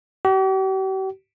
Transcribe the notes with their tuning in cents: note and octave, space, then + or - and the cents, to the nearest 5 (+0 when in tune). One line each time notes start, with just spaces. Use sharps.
G4 -45